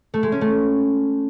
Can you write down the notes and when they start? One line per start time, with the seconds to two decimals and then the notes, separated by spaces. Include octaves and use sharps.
0.14 A3
0.23 G#3
0.32 C#4
0.41 A3